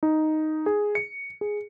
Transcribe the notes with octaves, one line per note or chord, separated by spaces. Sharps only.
D#4
G#4
C#7
G#4